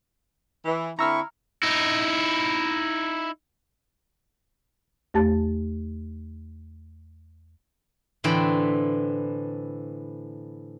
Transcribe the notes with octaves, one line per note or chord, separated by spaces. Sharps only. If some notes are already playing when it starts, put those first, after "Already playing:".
E3
D3 C4 E4 A#5 C#6 E6 F6
D#4 E4
E2 A3 G4 A5 A6
A2 D3 E3 C4 G5 B5